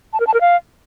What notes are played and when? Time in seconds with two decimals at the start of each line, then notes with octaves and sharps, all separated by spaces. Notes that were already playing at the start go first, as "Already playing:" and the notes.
0.13 A5
0.20 A#4
0.27 A5
0.34 A#4
0.41 F5